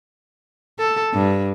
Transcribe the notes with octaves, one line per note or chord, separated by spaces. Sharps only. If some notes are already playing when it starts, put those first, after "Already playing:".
A4
G2